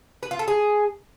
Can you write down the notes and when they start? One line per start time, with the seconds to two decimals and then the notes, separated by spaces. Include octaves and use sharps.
0.23 B4
0.31 F4
0.39 A4
0.48 G#4